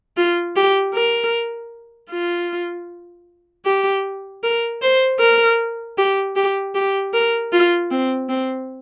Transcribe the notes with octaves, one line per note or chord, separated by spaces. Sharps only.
F4
G4
A#4
F4
G4
A#4
C5
A#4
G4
G4
G4
A#4
F4
C4
C4